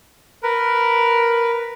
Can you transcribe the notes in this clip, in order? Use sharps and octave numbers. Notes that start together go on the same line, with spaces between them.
A#4 B4